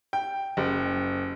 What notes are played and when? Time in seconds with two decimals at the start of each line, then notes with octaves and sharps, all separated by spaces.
0.13 G5
0.57 F#1